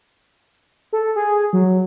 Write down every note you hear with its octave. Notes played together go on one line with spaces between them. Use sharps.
A4
G#4
F#3